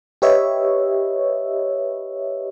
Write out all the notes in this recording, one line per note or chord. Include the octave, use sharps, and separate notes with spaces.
G4 B4 C#5 D#5 E5